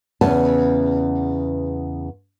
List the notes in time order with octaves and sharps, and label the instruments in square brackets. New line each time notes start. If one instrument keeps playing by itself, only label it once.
[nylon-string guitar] E2 C#3 B3 C#4 B4 A5